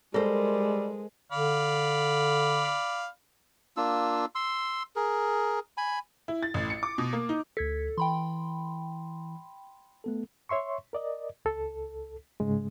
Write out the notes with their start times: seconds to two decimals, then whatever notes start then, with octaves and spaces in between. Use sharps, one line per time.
0.14 G3 G#3 A4 A#4 C5
1.32 D3 D5 F5 B5
3.77 A#3 D4 F4 E6
4.35 C6 E6
4.96 G#4 A#4
5.77 G#5 B5
6.28 E4
6.43 A6
6.54 A1
6.70 C#7
6.83 D6
6.98 B2
7.13 A#3
7.29 D#4
7.57 D2 A4 G#6 B6
7.98 E3 G5 B5 C6
10.04 A3 B3 A4
10.49 C#5 E5 C6 C#6
10.93 A#4 D5 D#5
11.45 C#2 A4
12.40 G#2 C#3 G#3